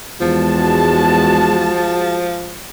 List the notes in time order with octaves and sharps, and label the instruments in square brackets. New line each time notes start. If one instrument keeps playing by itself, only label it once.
[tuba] E2 [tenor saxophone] F3 [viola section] G#3 F#4 A5